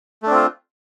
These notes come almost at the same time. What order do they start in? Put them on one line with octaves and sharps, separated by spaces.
A3 D4 C4 F4